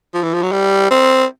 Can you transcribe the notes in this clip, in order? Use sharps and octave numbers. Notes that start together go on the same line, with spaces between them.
F3
E3
F3
F#3
G3
C4